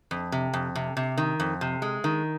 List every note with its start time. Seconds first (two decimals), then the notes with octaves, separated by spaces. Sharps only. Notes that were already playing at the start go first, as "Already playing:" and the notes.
0.11 F2
0.32 C3
0.54 F2
0.75 C3
0.97 C3
1.18 D#3
1.40 F2
1.61 C3
1.82 G#3
2.04 D#3